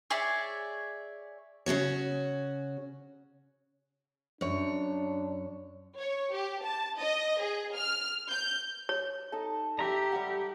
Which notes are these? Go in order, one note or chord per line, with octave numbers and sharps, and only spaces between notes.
G#4 C#5 D5 E5
C#3 C#4 F#4 C#5
F#2 D4 C#5
C#5
G4
A5
D#5
G#4
F6
G6
C#5
D#4 A4 A5
G4 E5 A#5
G3 F#5